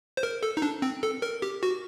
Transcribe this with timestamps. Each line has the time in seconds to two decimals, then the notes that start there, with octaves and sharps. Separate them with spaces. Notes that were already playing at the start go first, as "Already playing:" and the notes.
0.17 C5
0.23 A#4
0.43 A4
0.57 D#4
0.62 D4
0.82 C4
1.03 A4
1.22 A#4
1.42 G4
1.63 F#4